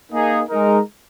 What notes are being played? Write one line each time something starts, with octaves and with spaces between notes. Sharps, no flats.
A#3 D#4 G#4
G#3 D#4 A#4